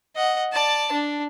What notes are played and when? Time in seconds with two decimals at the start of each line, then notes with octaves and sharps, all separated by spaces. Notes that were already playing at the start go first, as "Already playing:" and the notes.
0.16 D#5 F#5
0.52 D5 A5
0.92 D4